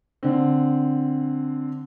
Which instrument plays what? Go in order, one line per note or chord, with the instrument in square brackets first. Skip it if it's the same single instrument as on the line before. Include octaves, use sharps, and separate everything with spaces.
[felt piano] D3 C4